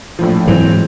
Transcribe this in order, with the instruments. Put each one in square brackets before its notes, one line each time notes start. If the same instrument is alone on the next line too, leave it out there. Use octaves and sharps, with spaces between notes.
[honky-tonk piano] A#1 A2 F3
[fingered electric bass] G#2 F#3 G#3 [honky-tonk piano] E3 C4